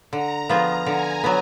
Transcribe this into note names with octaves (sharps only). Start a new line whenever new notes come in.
D3 A#5
F3 B3 F4 G#4
D3 G#5
F#3 B3